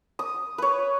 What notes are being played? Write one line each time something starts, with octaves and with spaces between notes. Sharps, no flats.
D#6
B4 C#5